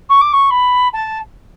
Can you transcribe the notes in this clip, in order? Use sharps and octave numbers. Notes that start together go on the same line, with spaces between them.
C#6
D6
C#6
B5
A5